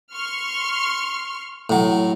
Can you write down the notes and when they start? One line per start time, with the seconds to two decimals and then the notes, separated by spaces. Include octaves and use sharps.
0.11 C6 C#6 F6
1.70 A2 F#3